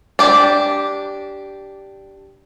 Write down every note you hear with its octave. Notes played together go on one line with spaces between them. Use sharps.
D4 G4